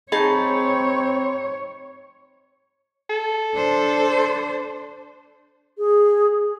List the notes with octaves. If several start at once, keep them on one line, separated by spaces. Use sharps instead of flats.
C4 D#4 G#4 C#5 A5 B5 G6
A4
D4 C5
G#4